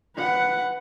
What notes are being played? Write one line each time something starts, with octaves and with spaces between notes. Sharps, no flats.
B4 F#5